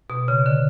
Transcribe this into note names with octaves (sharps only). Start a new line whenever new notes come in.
B2
C#3
D3